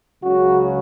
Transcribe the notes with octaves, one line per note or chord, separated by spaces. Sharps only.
C#2 C#3 F#3 F#4